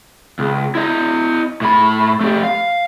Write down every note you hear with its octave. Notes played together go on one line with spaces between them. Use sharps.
C#2
E4 D#5
A2 B5
A3 G4
F5